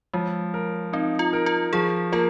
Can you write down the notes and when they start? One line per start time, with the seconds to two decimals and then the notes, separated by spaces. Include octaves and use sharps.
0.14 F3 G#3
0.54 A#4
0.93 C4 D#4
1.19 F4
1.33 A#4
1.46 F4
1.73 F3 G#4
2.12 A#3 F4